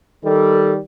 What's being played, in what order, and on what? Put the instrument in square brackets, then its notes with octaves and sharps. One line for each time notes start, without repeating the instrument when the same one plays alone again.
[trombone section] D#3 G3 [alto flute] A4